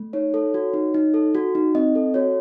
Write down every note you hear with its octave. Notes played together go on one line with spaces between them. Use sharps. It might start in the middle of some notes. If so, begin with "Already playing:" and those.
Already playing: A3
D#4 C#5
A4
F#4
D#4
D#4
A4
F#4
D#4
C4 D#5
A4
F#4 C#5